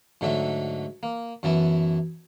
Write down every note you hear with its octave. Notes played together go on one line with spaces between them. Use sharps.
G#2 D3 F#3 A3 A4 E5
A#3
F#2 E3 B3 E4 A5